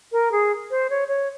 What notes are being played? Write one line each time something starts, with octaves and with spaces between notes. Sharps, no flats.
A#4
G#4
C5
C#5
C#5